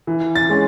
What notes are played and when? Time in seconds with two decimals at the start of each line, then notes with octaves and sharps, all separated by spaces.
0.07 E3
0.35 A6
0.49 G#3 C#4